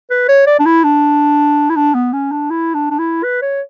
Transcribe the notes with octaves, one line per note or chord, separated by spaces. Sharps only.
B4
C#5
D5
D4
E4
D4
E4
D4
B3
C#4
D4
E4
D4
D4
E4
B4
C#5